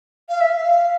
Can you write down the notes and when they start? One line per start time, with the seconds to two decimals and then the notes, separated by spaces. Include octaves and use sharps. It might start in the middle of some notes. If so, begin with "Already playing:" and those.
0.29 F5
0.40 E5
0.52 F5